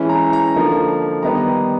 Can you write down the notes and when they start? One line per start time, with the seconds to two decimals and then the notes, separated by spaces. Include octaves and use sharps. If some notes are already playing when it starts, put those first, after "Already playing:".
Already playing: E3 G#3 C#4 E4
0.09 A#5
0.33 A#5
0.55 D3 F3 A#3 D#4
1.22 D#3 G3 B3 D#4 A#5